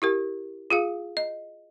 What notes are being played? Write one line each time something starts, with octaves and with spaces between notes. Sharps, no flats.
E4 G4 A#4
F4 G#4 F5
D#5